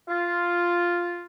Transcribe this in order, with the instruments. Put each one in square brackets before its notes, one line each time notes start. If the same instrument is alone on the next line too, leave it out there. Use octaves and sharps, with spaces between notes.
[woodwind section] F4